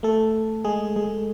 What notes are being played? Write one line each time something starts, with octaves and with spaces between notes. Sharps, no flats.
A3 A4
G#3 G#4
G#3 G#4